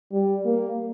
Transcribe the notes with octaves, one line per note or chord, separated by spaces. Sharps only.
G3
A#3